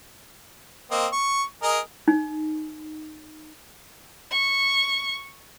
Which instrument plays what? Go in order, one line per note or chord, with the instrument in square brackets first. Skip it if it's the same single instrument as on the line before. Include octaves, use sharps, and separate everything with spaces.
[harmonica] A#3 C4 D#5
C#6
G#4 A#4 D#5
[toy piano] D#4
[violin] C#6